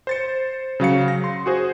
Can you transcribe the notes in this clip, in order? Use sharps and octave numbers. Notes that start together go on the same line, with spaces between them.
C5 A6 C#7
C#3 F#3 F5 C#7
A#6
C6
F#4 G#4 C5